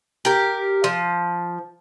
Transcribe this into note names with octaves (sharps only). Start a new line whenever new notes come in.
G4 A#4
F3